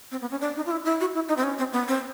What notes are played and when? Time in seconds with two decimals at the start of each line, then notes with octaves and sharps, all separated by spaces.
0.11 C4
0.21 B3
0.31 C#4
0.41 D4
0.56 D#4
0.66 F4
0.71 E4
0.85 E4
1.00 F#4
1.14 E4
1.29 D#4
1.37 C4
1.44 C#4
1.59 C4
1.73 B3
1.88 C4